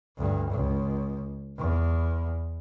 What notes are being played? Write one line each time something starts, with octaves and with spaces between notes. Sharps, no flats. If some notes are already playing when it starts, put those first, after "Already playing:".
D2 G2
C#2
E2